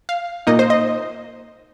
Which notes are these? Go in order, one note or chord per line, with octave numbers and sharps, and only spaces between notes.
F5
A#2 A#3 D#4 D#5
C5
D#5